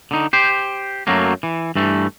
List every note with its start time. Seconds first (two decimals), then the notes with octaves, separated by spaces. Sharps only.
0.11 D3 D#4
0.33 G4 C5
1.07 F#2 F#3 A3 A#3
1.43 E3
1.76 G2 E3 A3